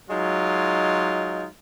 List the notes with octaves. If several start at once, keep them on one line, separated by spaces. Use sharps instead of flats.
F#3 G#3 D#4 F4